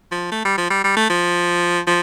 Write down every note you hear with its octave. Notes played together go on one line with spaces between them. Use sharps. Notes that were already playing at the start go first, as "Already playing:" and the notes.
F3
A3
G3
F3
G3
G3
A3
F3
F3